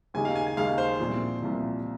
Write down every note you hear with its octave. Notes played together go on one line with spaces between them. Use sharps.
D#2 C#3 G#3 D#4 G4 G#5
F5
G#5
G#5
D#2 C#3 G#3 D#4 G4 F5
C5
C2 A#2 F3
C2 A#2 F3